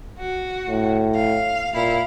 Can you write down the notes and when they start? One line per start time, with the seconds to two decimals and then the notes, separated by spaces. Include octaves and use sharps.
0.19 F#4
0.68 A2
1.14 F5
1.75 A#2 E4 F5